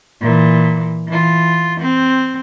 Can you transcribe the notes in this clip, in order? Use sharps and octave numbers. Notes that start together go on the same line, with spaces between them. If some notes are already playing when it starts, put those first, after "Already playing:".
A#2 E3
E3 F4
C4